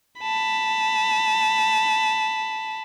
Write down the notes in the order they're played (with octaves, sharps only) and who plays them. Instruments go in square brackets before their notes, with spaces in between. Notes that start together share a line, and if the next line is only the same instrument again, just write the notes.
[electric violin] A5 B5